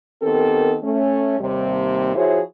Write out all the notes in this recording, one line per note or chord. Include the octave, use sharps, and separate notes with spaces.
D#3 B3 C4 G4 A4 A#4
A3 C#4
D#2 C3 G3
F3 E4 F#4 G#4 C5 C#5